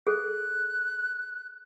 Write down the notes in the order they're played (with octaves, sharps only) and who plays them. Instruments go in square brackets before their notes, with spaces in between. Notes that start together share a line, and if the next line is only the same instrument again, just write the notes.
[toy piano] G#4 A4 [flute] F#6